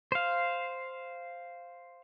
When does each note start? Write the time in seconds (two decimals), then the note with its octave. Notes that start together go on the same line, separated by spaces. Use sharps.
0.12 C5 F5